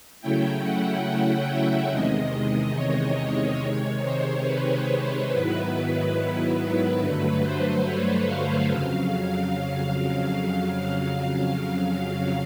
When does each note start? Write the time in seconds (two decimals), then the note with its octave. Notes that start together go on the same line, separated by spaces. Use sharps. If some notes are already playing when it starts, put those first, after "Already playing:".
0.21 C#3 F#3 A3 C#4 E4 G5
0.63 F#5
1.06 F#5
1.48 E5
1.91 E2 C3 D#3 G#3 D#5
2.75 C#5
3.18 C#5
3.60 C3 D#3 G#3
4.02 C5
4.45 B4
5.30 G#2 D#3 F#3 B3 E4
6.14 B4
6.56 B4
6.99 G2 D3 F#3 A3
7.41 C5
7.84 C#5
8.26 F5
8.68 F2 C#3 F#3 F5